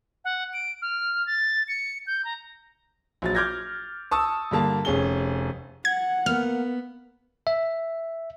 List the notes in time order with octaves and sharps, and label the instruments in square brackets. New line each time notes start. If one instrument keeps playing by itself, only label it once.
[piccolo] F#5
D7
F6
A6
C#7
G6
A#5
[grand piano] A#1 F#3 A6
D6 F6 G6 G#6 A#6
A5 C#6 D#6 E6
G2 D3 A#3 A5
F1 C#4 G#4 G7
[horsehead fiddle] F#5 [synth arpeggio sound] G#6
[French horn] A#3 [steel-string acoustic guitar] B3 [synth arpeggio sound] F6
[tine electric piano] E5